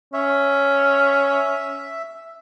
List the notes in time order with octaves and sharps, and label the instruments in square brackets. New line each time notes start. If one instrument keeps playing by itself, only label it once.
[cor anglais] C#4 [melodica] E5